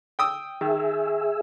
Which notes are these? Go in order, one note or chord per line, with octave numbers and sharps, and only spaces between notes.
G5 D#6 E6
D#3 G#4 E5